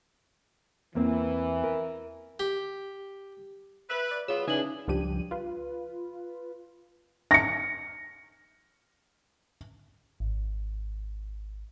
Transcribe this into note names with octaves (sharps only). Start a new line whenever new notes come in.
E2 E3 A#3 C4
A#4
G4
B4 E5
D5
F#3 B3 F4 G#4 C#5 E6
C#3 E3 D4 D#4 G#4 F#7
C#2 G2 F3 D4 G4 D#7
F4 B4
A#6 C#7
G#1